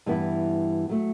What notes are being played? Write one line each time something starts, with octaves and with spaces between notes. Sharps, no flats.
G2 E3 B3 E4
F#3 A3